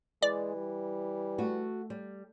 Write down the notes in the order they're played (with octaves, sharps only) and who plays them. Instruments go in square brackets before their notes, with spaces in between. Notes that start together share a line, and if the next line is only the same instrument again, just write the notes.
[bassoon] E3 [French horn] G#3 [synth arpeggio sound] D5
[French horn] G3
[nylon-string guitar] A3 F#4
G3